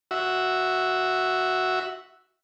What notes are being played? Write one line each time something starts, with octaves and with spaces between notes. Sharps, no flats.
F#4 E5